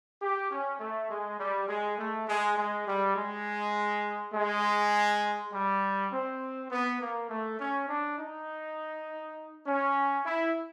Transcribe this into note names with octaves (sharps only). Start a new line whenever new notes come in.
G4
C#4
A3
G#3
G3
G#3
A3
G#3
G#3
G3
G#3
G#3
G3
C4
B3
A#3
A3
C#4
D4
D#4
C#4
E4